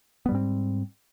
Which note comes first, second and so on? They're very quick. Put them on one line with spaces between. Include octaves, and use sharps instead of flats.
B3 G3 G#2 C4